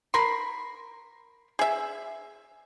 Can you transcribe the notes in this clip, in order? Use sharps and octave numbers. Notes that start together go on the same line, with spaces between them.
A#4 B5 C6
G#4 E5